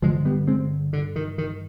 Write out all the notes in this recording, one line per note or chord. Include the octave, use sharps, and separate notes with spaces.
G2 D3 F3 G#3
G3 B3
G#3 C4
D3
D#3
D#3